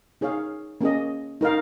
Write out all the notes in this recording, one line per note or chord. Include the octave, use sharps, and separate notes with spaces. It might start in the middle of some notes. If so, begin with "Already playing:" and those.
D#4 G#4 C#5 F5
A#3 C#4 G#4 D#5
D#4 A#4 F5